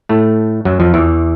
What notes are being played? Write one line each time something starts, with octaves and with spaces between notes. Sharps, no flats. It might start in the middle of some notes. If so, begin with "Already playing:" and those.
A2 A3
F#2 F#3
F2 F3
E2 E3